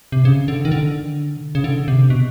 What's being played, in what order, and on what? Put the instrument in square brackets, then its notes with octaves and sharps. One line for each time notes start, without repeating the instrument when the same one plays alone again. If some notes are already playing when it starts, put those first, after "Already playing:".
[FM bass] C3
C#3
D3
D#3
D3
C#3
D3
C3
B2